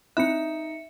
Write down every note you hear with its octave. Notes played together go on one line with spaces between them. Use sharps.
C4 D#4 E4 E5 F#6 C#7